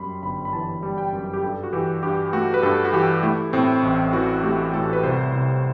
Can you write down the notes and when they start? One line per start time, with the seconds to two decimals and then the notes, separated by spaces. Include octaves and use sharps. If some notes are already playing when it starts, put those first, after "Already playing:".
Already playing: F#2 G3 B5 C6
0.23 G1 B5
0.45 B5
0.53 E3 A5
0.83 G3
0.98 G5
1.13 F#2
1.34 G4
1.43 G2 A4
1.63 F#4
1.73 E3 G4
2.03 G2 G4
2.33 A3 F#4
2.54 B4
2.63 G2 A4
2.85 F#4
2.93 E3 G4
3.23 A3 E4
3.53 A2 C4
3.83 A1
4.13 E3 F#4
4.43 A3 G4
4.73 A2 A4
4.93 B4
5.03 C2 C5
5.33 C3